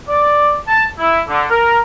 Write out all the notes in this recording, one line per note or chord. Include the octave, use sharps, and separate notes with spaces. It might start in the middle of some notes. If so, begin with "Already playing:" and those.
D5
A5
E4
D3
A#4